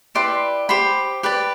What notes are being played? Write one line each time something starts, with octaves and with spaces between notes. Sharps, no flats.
E4 G4 B4 D5 C6
G4 C5 B5
G4 B4 D5